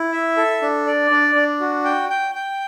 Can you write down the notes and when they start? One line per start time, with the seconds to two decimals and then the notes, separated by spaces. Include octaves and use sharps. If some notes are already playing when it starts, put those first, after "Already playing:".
Already playing: E4
0.12 E5
0.37 A4
0.62 D4
0.87 D5
1.11 D4
1.35 D4
1.61 F#4
1.85 G5
2.09 G5
2.35 G5